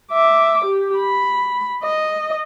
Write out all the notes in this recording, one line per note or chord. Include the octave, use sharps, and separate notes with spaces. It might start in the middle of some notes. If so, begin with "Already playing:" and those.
E5 D6
G4
B5
D#5